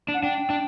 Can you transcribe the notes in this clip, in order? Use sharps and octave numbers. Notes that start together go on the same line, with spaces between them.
D4
F#5
D4 G5
D4